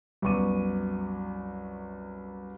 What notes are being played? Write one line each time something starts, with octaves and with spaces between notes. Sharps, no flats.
C2 F#2 B3 C#6 D6 D#7